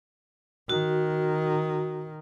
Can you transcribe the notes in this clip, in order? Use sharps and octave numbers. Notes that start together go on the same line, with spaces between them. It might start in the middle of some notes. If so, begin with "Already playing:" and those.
D#3 F#4